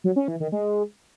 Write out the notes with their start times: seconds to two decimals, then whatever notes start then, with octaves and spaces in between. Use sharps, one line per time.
0.04 F#3
0.16 C#4
0.28 E3
0.40 D#3
0.52 G#3